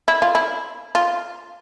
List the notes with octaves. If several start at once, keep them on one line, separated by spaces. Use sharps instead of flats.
E4
F4
E4
F4